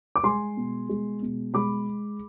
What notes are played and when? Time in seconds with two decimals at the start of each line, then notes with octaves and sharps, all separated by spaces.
0.16 D6
0.24 G#3 G#5 C6
0.57 B2
0.89 G#3
1.22 B2
1.54 G#3 B5 D6